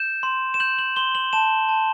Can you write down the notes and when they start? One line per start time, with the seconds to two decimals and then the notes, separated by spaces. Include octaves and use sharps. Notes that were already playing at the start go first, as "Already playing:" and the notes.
Already playing: G6 E7
0.23 C6
0.54 E7
0.60 G6 F#7
0.79 F#7
0.96 C6 G7
1.15 F#7
1.33 A5 E7
1.69 A5